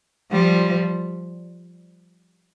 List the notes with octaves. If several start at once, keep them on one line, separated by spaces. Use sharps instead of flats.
F3 G3